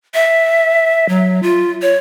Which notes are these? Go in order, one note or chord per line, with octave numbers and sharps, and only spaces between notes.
E5
F#3
F4
C#5